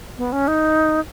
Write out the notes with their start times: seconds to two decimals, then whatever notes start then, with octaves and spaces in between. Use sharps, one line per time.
0.18 B3
0.32 C#4
0.48 D#4